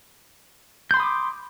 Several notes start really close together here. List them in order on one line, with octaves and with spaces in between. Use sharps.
G6 C6 B5 D#6 D6